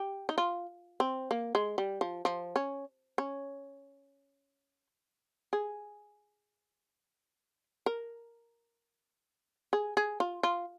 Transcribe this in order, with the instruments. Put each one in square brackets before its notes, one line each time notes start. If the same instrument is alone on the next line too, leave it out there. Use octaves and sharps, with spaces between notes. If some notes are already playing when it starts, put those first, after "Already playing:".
Already playing: [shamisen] G4
D#4
F4
C4
A#3
G#3
G3
F3
F3
C#4
C#4
G#4
A#4
G#4
G#4
F4
F4